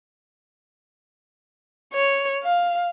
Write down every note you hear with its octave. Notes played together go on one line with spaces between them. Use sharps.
C#5
F5